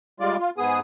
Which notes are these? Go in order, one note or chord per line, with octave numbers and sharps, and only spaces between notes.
G3 G#3 F4 D5
F4
G#2 B3 G#4 D#6